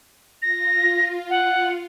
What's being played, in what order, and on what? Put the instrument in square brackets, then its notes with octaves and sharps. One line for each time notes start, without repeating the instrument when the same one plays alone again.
[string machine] F4 [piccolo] A#6
[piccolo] F#5